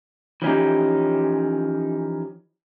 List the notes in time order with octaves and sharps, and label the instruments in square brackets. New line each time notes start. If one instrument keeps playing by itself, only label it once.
[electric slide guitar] E3 F3 C#4 D#4 G4